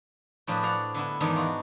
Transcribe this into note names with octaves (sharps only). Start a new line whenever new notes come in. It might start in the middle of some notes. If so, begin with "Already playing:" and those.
A2 F3 D4 G#4 B4
D5 F5 F#5
D3 B3 E4
E2 G#2 D#3 B3 D4
F4 F#4